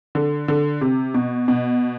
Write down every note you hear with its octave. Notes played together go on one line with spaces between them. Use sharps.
D3
D3
C3
B2
B2